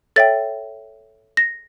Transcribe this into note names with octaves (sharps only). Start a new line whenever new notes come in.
A4 C#5 E5 G5 A6
A#6